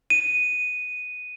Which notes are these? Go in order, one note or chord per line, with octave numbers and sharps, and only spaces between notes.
D#7